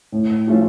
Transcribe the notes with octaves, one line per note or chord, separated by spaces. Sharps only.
A2
F3 A3 C#4 F4